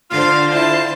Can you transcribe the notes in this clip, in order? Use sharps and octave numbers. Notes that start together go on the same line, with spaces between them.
D3 F4 C5 F5
E4 A5